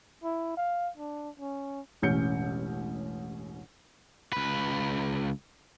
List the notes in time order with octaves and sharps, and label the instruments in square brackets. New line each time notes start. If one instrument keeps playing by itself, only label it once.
[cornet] E4
F5
D4
C#4
[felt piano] E1 A1 C#4 G6 C#7
[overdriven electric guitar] C#2 B4